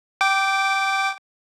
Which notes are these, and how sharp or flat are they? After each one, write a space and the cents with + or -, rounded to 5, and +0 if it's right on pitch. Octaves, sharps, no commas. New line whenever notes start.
G5 -15 D6 +0